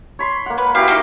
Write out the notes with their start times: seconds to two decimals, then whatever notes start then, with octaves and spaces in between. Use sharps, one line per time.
0.19 C#5 B5 C6
0.46 A#3 F#5
0.58 B4
0.75 E4 F#4 G4 F5
0.88 A#3 D#4